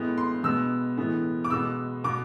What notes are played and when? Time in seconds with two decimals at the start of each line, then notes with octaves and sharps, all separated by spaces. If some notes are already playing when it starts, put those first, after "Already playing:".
Already playing: A2 G#3 B3
0.18 C6
0.44 B2 G#3 B3 E6
0.97 A2 E3 G#3 B3
1.44 D6
1.50 B2 G#3 B3 E6
2.04 B2 B3 D6